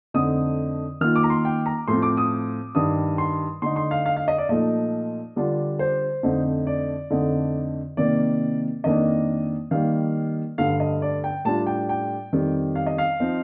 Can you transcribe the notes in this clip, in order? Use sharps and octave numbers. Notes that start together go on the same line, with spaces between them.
F2 D3 A3 D#4 D#6
D#3 A#3 F4 F6
D6
A#5
C6
G5
A#5
A2 F3 A3 C4 F4 C6
D6
D#6
G2 D#3 G3 D#6
C6
D3 A3 D#4 C6
C6
F5
F5
F5
D#5
D5
A#2 F3 A3 D#4 D#5
D3 G3 D4 F4
C5
F2 D3 A3 D#4
D5
F2 D3 A3 D#4
C3 D#3 A#3 D5
F2 D#3 A#3 D4 D#5
D#3 G3 A#3 F5
G2 D3 A3 F5
D#5
D5
G5
A2 G3 D4 F4 A5
G5
G5
F2 D#3 G3
F5
D#5
F5
F3 C4 D#4